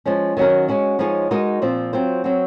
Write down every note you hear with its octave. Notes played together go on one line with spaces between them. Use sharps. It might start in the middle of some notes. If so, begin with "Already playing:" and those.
F3 G#3 C#4
D#3 F#3 C#4 F#4 A#4
G#3 C#4 F#4
F3 G#3 D#4 G#4 C#5
G#3 D#4 F#4 A#4 D#5
A#2 F3 C4
F#3 C4 F4 C5
F#3 C4 F#4